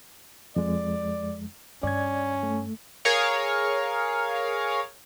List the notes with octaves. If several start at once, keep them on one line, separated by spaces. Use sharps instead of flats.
F2 G#3 D5
G2 C#4 D5 G#6
A3
G#4 A#4 C#5 F5